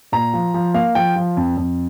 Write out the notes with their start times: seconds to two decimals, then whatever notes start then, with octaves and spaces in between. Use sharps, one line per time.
0.12 A#2 A#5
0.34 F3
0.54 F3
0.74 A#3 F5
0.95 F3 G5
1.16 F3
1.37 F2
1.57 F2